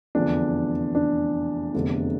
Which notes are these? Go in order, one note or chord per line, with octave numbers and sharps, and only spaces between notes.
F1 E2 D3 F3 D4
D4
F1 E2 D3